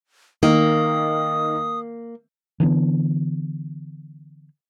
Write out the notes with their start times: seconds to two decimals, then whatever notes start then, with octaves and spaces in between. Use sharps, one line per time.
0.43 D#3 A#3 D#6
2.60 D3 E3 G3 B3